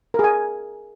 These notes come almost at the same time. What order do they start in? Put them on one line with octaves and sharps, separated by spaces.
A#4 G#4 G#5